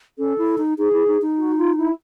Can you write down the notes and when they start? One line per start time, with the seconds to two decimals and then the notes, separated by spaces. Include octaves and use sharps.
0.18 C#4 A4
0.38 E4
0.58 D#4
0.78 D#4 G#4
0.93 E4
1.07 D#4
1.22 D#4
1.38 F#4
1.57 F4
1.77 E4